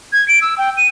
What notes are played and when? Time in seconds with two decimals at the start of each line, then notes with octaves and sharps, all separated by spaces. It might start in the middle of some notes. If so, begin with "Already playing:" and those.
0.13 G#6
0.28 D7
0.42 E6
0.58 G5
0.77 D#7